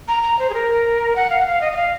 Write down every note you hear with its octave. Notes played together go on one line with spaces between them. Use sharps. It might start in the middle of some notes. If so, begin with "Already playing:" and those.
A#5
A#5
C5
G#4
A#4
F#5
F5
F#5
F5
D#5
D#5
F5